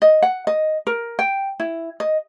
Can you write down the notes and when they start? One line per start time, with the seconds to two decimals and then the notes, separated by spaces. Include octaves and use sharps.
0.02 D#5
0.22 F#5
0.47 D#5
0.87 A#4
1.19 G5
1.60 E4
2.00 D#5